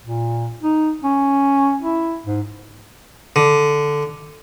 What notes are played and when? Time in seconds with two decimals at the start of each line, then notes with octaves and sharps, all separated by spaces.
0.03 A#2
0.63 D#4
1.04 C#4
1.82 E4
2.25 G#2
3.36 D3